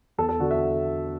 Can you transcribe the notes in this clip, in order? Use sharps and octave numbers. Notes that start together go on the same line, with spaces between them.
E2 A4
A4
D3 F#4
E5